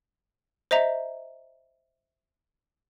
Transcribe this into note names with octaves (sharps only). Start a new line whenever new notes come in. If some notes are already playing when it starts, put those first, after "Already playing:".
C5 D#5 E5 A#5